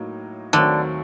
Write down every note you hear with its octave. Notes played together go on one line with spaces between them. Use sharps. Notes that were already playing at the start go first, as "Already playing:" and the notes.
Already playing: A2 F#3 A#3 D#4
D#2 D3 D#3 F#3 A3 C4